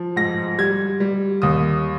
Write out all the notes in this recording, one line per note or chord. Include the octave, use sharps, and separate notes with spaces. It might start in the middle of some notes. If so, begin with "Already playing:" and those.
Already playing: F3
G#2 A#6
G3 G#6
G3
D#2 D#6